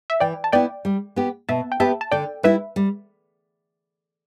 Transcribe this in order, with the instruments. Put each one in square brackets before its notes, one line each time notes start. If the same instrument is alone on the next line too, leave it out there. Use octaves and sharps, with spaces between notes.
[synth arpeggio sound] E5
[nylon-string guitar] E3 [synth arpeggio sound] D5 G5
[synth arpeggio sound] A5
[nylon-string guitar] B3 E4 [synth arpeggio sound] D5 G5
[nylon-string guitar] G3
B3 G4
[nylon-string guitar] B2 [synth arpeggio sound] E5 A5
[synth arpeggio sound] G5
[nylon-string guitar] B3 G4 B4 [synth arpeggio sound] E5 A5
[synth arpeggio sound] A5
[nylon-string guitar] D3 [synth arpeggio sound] D5 G5
[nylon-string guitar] G3 E4 [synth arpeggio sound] B4 E5
[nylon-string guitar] G3